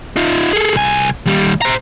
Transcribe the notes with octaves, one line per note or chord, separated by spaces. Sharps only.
D#4 F4
G#4 A4
C2 G#5
D#2 G3
C5 A#5